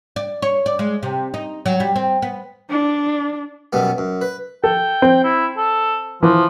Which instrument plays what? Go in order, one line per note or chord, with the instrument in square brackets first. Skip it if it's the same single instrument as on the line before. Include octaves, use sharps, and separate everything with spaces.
[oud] D5
C#5
D5
G#3
C3
D#4
F#3
G3
C4
B3
[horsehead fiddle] D4
[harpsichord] F#2 B2 G3 B3
F#2
B4
[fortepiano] A4 [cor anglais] G5
[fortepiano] C4
[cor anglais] E4
A4
[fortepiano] E3 [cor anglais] F3